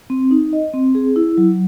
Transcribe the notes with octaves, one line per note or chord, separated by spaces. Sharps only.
C4
D#4
D#5
C4
G#4
E4
F#3